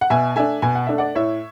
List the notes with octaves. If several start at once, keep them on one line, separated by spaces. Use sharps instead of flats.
F#5
B2 E5 G#5
A3 D4 E5 G#5
B2 G#5
F#5
A3 D4 E5
D5 F#5
A2 C#5 E5